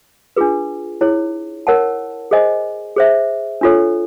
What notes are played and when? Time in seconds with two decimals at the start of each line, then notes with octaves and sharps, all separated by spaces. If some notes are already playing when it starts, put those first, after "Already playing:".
0.36 D4 F4 G#4 B4
1.01 E4 G#4 C#5
1.67 A#4 C#5 F#5 A5
2.31 G#4 C5 D#5 G#5
2.97 G#4 C5 E5
3.61 D4 F4 A4 C#5